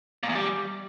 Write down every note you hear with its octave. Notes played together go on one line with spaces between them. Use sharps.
A#2
E2
G3